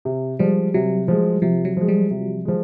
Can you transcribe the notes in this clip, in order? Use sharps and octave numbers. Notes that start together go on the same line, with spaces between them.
C3
F3 G3 G#3
C3 F#3
F3 G#3
C3 F3
F#3
F3 G#3
G3
C3
F3 G#3